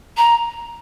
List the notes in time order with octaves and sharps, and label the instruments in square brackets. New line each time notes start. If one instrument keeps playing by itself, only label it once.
[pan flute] A#5